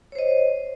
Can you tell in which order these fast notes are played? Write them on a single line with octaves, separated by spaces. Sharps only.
C#5 C5 D#5